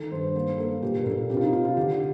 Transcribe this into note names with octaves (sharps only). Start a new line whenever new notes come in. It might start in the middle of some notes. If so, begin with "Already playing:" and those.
Already playing: D#3 A4
G2 C5
A#3 C5
A#3 A4
A#2 G4
A#4
A#2 A4
C3 G4
F4
D#4
C3 F4
F4
D3 G4